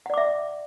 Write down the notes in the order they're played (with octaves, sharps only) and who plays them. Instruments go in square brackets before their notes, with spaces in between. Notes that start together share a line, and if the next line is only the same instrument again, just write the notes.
[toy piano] F#5
D5
D6
E5